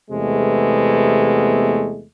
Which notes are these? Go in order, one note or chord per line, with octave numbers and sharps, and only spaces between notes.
E2 C3 G#3 A3 B3